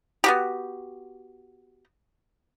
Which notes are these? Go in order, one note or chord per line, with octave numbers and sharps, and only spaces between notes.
B3 F#4 G4